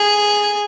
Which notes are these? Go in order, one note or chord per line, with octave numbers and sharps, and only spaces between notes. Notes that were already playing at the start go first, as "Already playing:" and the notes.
Already playing: G#4